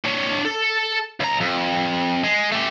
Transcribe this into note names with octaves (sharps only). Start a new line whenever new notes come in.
D4 C#5
A4
C#2 A#5
F2
G#3
A3 G4